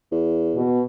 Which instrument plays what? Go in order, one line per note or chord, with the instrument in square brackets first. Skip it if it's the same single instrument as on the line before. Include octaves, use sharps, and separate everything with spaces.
[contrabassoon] E2
[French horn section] B2